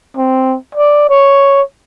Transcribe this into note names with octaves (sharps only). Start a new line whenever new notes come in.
C4
D5
C#5